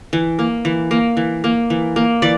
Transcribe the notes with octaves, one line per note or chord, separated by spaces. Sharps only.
E3
A#3
E3
A#3
E3
A#3
E3
A#3
E3 D5